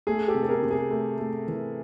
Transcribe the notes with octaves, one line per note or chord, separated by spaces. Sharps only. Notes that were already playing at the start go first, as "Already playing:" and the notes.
A3 G#4
G4 A4
C3
A4
G#4 A#4
C3
G#4
A3
A3
E3